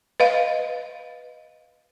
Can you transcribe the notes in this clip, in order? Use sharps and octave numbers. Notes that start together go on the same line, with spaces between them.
B4 D#5 F5